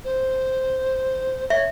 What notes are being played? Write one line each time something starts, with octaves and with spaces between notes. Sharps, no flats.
C5
C#5 E5